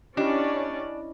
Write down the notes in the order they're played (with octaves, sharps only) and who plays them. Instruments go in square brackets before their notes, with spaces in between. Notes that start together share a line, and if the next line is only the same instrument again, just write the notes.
[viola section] C#4 D5 [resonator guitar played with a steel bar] D4 [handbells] E4 D#5 [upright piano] G4